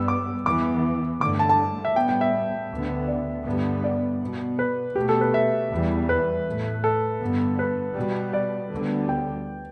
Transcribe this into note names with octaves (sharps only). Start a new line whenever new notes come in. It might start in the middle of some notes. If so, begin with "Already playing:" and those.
Already playing: G2 G3 B3 E6
D6
E2 E3 B3 D6
G2 D3 A3 D6
A5
A5
E5
A2 G3 B3 G5
G5
E5
D2 D3 B3
D5
G2 D3 G3 B3
D5
B2 B3
B4
B2 A3 G4
A4
B4
E5
E2 E3 G3
B4
A2 A3
A4
G2 D3 B3
B4
B2 G3 B3
D5
D2 D3 G3 B3
G5